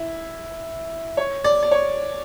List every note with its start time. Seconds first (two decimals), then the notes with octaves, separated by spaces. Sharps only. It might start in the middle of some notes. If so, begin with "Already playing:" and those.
Already playing: E4
1.17 C#5
1.44 D5
1.63 D5
1.71 C#5